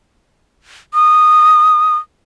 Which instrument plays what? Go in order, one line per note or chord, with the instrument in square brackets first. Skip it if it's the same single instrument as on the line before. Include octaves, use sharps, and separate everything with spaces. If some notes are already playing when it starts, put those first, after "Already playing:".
[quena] D#6